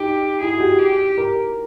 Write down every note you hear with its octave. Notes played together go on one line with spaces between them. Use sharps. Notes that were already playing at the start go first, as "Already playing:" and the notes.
Already playing: D#4 G4
E4 G#4
F#4
G4
G4
A#4